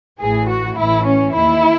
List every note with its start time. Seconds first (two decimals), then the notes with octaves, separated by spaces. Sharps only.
0.20 A1 A2 E3 G#4
0.49 F#4
0.77 A1 A2 E3 E4
1.06 C#4
1.34 D#2 D#3 E4